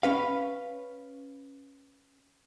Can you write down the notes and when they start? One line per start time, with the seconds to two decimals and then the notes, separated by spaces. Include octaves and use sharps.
0.03 C#4 B4 F5